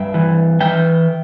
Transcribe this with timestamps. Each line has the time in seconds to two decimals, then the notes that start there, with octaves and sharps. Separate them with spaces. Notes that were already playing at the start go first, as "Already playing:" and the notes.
Already playing: G2 E5 G5
0.14 E3
0.60 E3 E5 G5